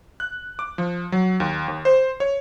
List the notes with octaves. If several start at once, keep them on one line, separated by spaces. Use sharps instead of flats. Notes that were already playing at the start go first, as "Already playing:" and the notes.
F#6
D6
F3
F#3
D#2
D#2
C5
C#5